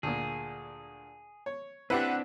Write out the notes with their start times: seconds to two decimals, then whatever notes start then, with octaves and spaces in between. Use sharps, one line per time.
0.03 D2 A#2 G#4
1.46 C#5
1.90 C4 D4 E4 G4 B4 F#5